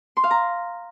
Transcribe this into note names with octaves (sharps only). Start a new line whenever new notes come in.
C6
F5
A#5